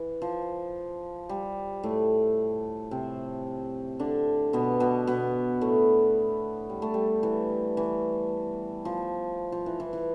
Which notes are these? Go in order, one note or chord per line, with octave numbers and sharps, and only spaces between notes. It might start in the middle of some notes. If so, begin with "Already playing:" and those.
Already playing: E3
F3
G3
A2 A3
C3 C4
D3 D4
B2 B3
B2 B3
B2 B3
A2 A3
G3
A3
G3
E3
E3
F3
F3
E3
E3
E3